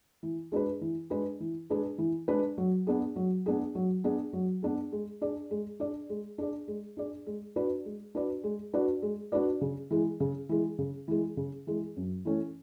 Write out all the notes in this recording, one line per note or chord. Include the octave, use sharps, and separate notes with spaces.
E3
G#3 D4 G#4 B4
E3
G#3 D4 G#4 B4
E3
G#3 D4 G#4 B4
E3
G#3 D4 G#4 B4
F#3
B3 D4 G#4
F#3
B3 D4 G#4
F#3
B3 D4 G#4
F#3
B3 D4 G#4
G#3
D4 G#4 D5
G#3
D4 G#4 D5
G#3
D4 G#4 D5
G#3
D4 G#4 D5
G#3
D4 F#4 B4 D5
G#3
D4 F#4 B4 D5
G#3
D4 F#4 B4 D5
G#3
D4 F#4 B4 D5
C#3
E3 G#3
C#3
E3 G#3
C#3
E3 G#3
C#3
E3 G#3
F#2
E3 A3 C#4